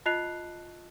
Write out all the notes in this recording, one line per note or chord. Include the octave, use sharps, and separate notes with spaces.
F4 D#5 A5 F#6 C7 F7